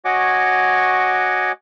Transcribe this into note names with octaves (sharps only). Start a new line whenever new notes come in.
F#4 C#5 D#5 F#5 G#5 D6